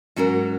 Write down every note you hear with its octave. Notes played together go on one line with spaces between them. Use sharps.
G#2 F#3 C#4 F#4 A#4